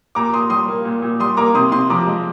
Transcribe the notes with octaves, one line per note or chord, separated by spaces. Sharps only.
A#2 A#5 D6
A#2 C6 D#6
G3 C6 D#6
A#3
A#2
A#2
G3 C6 D#6
A#3 A#5 D6
C3 C6 D#6
C3 C6 D#6
F3 A#5 D6
G#3